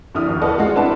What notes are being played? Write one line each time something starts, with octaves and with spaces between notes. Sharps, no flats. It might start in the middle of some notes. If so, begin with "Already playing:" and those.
A#1 D3 D4 E4 D#6 F6
G1 D#2
E4 A4 B4 D5 D#5 F#5
G#3 F4 F#4
C4 D4 E4 B4 F#5 A5